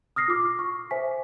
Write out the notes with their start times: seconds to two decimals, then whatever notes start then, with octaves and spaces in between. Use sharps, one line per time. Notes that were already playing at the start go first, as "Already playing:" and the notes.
0.16 D#6 F6 A#6 C7
0.28 F4 D6 F6
0.59 C#6
0.91 C5 E5 G#5 B6